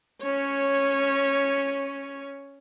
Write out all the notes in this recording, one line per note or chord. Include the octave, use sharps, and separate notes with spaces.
C#4 C#5